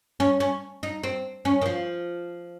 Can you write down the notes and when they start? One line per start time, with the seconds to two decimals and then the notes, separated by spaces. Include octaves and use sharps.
0.20 C#4
0.40 C#4
0.83 D#4
1.03 C4
1.45 C#4
1.62 D#3
1.66 F3